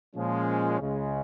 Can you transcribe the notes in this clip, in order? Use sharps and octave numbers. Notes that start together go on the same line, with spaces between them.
A#2 F3 G#3 C#4
C#2 C#3 G#3